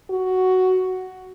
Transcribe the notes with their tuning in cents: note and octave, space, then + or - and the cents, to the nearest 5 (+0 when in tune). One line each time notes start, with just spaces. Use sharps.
F#4 +5